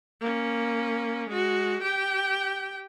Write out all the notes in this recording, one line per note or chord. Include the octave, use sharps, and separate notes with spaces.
A#3 C#4
G#3 F#4
G4 G5